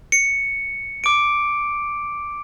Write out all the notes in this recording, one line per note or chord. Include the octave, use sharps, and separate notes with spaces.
C#7
D6 D7